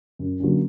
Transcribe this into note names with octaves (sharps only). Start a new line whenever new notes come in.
F#2
D3 F#3 A#3 C#4